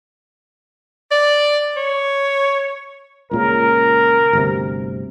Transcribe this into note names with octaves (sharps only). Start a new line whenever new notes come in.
D5
C#5
C#2 A#2 C#3 A#4
G1 D2 C3